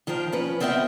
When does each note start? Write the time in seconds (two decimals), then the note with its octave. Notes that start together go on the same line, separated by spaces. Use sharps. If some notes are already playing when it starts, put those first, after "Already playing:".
0.07 D#3 F3 C5 G5 A#5
0.33 F3 C#4 B4
0.60 B3 C4 A#4 D#5 E5 G5